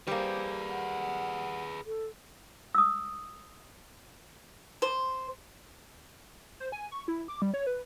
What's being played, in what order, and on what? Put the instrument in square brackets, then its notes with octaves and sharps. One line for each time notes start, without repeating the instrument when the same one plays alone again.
[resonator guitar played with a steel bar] G3 A#3 [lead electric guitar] G#4 B4 [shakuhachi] C5
[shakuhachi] F#5
A4
[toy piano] D#6 E6
[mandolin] C5
[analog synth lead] C5
G#5
C#6
E4
D6
G3
C#5
B4